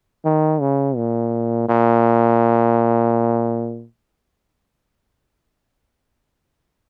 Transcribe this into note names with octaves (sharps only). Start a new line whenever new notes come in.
D#3
C#3
A#2
A#2